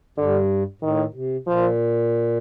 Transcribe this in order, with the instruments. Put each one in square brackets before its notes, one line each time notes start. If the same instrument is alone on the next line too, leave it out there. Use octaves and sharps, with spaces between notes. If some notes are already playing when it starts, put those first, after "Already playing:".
[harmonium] G2 [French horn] D3
[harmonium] A2 [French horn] D#3
[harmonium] C3
[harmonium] A#2 [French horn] F3